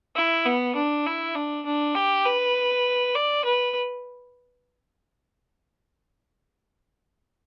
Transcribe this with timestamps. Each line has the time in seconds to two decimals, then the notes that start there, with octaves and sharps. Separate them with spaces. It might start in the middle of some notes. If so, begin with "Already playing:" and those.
0.16 E4
0.46 B3
0.76 D4
1.06 E4
1.35 D4
1.66 D4
1.95 G4
2.26 B4
3.15 D5
3.45 B4